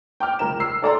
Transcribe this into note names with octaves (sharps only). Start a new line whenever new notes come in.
G5 D6 F6
C#2 A#4 E7
E6 C7
A4 D5 A#5 C6